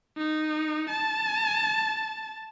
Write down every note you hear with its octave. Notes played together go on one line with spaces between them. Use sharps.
D#4
A5